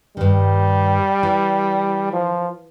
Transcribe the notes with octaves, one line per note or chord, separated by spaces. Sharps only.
G2 D#3 G3
E3
F3